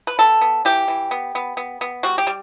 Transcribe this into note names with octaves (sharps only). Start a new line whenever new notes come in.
B4
B3 A4
B3
E3 G4
E3
B3
B3
B3
B3
G3 F#4
G4
G3